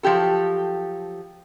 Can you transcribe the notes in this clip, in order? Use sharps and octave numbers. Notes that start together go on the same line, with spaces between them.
F3 F#3 G4 A4